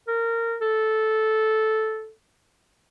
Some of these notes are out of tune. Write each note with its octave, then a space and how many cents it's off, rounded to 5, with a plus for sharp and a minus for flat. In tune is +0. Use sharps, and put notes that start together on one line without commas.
A#4 -20
A4 -10